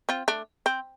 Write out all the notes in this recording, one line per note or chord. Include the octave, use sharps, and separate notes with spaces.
C4 F4
A3 D4
C4